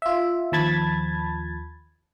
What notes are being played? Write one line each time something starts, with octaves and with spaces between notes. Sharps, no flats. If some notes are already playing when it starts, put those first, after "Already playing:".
F4 E5
D#2 F3 A5 B5 G#6 A6